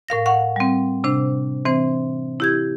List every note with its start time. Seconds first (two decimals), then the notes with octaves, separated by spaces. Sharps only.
0.09 A2 A#4 F5 A#6
0.26 F5 F#5 C#6
0.56 G3 C4
1.04 C3 D4 C5
1.65 E3 C4 C5
2.40 E4 G4 G#6